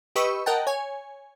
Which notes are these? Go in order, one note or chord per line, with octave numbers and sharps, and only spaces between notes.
G4 B4 D#5 B5 C#6 E6
A#4 D#5 F#5 G5 A5
C#5 G#5